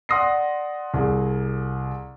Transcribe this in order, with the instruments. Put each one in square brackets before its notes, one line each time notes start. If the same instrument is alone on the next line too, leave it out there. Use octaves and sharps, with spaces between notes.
[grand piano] D5 F#5 C6 D#6 A#6 C7
C2 G#4